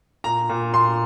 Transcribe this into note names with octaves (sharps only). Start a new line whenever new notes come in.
A#2 A#5
A#2
A#2 C6